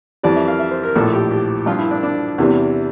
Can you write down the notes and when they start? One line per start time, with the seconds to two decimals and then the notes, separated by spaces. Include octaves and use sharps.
0.23 F2 E3 G3 D5
0.36 E5
0.48 F5
0.59 E5
0.71 C5
0.83 A#4
0.95 A#1 A2 F3 A4
1.13 G4
1.31 G4
1.66 G2 F3 F4
1.79 E4
1.91 D4
2.03 D4
2.38 E2 C3 E3 G3